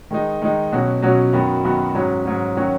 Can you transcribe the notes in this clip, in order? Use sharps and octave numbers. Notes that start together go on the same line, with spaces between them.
D#3 G#3 D#4
D#3 G#3 D#4
B2 F#3 C#4 F#4
B2 F#3 C#4 F#4
F#2 D#3 B3 F#4
F#2 D#3 B3 F#4
G#2 F#3 C#4
G#2 F#3 C#4
D#3 F#3 C#4 F#4